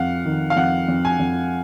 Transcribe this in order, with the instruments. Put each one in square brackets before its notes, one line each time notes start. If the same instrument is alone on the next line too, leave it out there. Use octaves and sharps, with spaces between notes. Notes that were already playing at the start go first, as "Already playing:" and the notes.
Already playing: [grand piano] F2 [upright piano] F5 F#5
[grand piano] D#3
[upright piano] F5
[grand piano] F2 [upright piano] F#5
[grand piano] F2
[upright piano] G#5
[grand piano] F2